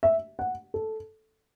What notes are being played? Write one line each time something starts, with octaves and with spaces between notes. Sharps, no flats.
E5
F#5
A4